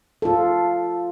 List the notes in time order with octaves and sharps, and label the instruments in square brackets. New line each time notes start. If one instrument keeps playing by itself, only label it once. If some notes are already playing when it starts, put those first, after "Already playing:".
[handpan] F4 A4